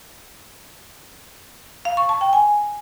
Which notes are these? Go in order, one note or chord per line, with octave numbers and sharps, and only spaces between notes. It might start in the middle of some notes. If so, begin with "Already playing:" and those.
F5
C#6
A5
G5
G#5